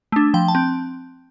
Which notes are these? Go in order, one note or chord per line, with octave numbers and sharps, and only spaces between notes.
A3 D4
F3 G5
A5
C4